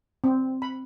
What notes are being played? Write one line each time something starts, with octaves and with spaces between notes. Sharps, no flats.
C4
B5